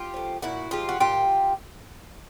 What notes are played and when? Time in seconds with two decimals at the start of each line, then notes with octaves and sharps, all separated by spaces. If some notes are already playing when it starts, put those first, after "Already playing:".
Already playing: F4 G4
0.14 F3 A3
0.42 A#2 E4 F#4
0.71 F3 G#3 F4 G4
0.89 F#4
1.00 A#2 F4 G4